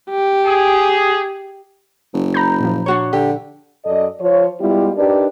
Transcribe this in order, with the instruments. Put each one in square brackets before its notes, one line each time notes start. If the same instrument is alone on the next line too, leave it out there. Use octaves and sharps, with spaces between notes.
[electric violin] G4
[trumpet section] G#4
[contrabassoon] F#1
[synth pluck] A#5 B5 G6
A#2 F3
[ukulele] D4 F#4 C#5
[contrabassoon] D3 [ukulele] G4
[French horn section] F#2 A4 D5 D#5
F3 F4 C5 C#5
G3 G#3 B3 E4 F4 G4
D4 D#4 G4 A#4 B4 D5